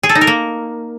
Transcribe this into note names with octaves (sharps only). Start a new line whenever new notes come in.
G#4
A4
D#4
A#4
A#3